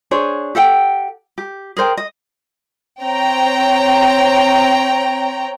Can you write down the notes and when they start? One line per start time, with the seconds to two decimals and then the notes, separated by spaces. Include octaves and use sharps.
0.11 D4 G#4 C5 C#5
0.55 G4 A4 F#5 G5
1.38 G4
1.77 G#4 A#4 C5 G5
1.97 D#5
3.02 C4 C#5 G5 A#5